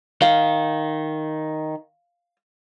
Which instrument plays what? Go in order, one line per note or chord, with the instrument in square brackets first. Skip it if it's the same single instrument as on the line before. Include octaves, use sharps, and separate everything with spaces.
[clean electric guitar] D#3 [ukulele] F5